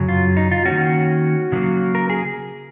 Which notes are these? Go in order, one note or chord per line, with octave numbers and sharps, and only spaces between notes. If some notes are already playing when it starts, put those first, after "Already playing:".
Already playing: F#2 C#3 F#3
F4
D#4
F4
D#3 A#3 C#4 F#4
C#3 F#3 A#3
A#4
G#4